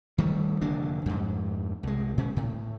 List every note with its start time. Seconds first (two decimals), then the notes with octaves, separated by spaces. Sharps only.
0.18 D#3 G3 A3
0.61 F1 D3 A#3 D4
1.06 F2 G#2
1.83 C2 G#3
2.18 A#2 C#4
2.37 A2